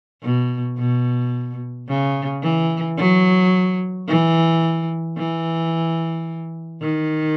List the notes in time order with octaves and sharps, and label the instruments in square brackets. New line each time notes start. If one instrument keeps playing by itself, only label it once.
[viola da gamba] B2
B2
C#3
E3
F#3
E3
E3
D#3